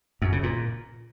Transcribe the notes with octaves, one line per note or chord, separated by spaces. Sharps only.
F#2
C#3
A#2